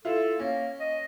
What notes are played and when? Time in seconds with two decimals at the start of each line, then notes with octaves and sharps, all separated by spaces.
0.05 E4 F4 A4
0.39 A#3 C#4
0.80 D#5